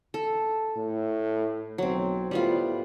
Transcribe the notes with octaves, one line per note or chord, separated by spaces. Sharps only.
A4
A2
B1 F#3 C4
A2 G3 B3 F4